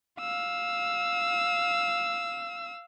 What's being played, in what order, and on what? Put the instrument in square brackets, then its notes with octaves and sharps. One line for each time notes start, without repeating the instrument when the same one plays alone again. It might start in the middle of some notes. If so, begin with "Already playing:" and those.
[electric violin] F5 E6